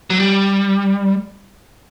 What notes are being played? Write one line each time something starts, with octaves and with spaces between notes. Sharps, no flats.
F#3
G3